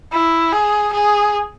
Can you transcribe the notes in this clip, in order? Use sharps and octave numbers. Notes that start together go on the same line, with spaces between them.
E4
G#4
G#4